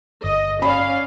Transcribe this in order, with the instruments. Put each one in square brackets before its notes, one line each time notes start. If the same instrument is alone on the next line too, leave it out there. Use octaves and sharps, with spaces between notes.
[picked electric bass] G1 [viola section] D#5
[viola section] C#4 F5 [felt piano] D5 B5